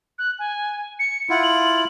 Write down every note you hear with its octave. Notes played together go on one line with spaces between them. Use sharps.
F#6
G#5
C#7
E4 F4 F#5
F#7